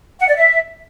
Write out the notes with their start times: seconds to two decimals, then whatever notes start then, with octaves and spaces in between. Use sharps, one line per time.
0.20 F#5
0.28 D5
0.36 E5